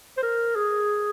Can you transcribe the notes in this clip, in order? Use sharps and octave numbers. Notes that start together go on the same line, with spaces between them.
C5
A#4
G#4